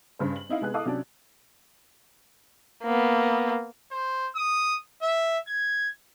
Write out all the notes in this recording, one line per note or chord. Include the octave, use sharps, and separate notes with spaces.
G2 C#3 C5
F#7
C4 D#4 E4 F5
C3 G#3 B3 G#4 F#6
E4 A4 D#5 F5 D6 D#6
C3 F#3 C#4 D4
A#3 B3
C5
D#6
E5
G#6